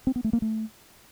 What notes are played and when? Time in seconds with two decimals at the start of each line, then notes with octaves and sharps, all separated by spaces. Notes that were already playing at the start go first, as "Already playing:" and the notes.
0.07 C4
0.16 B3
0.24 A3
0.33 A#3
0.42 A3